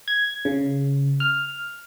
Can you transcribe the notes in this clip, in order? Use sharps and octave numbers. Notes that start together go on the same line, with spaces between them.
G#6
C#3
F6